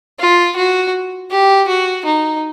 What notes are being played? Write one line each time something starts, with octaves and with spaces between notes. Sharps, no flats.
F4
F#4
G4
F#4
D#4